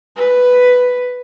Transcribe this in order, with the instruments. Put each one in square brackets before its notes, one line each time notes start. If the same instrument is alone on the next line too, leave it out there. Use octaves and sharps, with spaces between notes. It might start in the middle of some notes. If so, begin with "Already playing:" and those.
[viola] B4